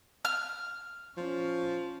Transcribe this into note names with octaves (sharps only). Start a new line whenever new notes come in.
F6
F3 C#4